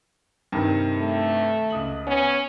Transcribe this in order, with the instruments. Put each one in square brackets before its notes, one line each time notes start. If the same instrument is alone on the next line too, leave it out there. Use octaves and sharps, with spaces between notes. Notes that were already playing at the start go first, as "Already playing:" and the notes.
[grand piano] G2 C3 D#3
[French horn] A3
[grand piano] C#2 D#6 F#7
[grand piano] B3 [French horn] C#4